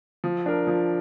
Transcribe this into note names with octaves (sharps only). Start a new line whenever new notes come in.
F3
D4 A#4
F3